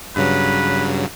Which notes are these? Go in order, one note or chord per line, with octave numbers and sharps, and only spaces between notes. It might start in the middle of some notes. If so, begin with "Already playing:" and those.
G2 C#3 F#3 B4